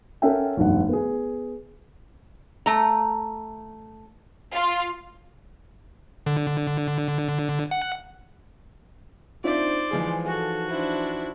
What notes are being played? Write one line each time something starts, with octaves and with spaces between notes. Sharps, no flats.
C#4 A4 A#4 E5 F#5 G5
F1 B1 G2 D#3 F#5
B3 G#4
A3 A#5
F4
D3
F#5
C4 D4 D#4 F4 C5 D5 E5
E3 F3 G#3 G#4
F#4 A4
D4 E4 C5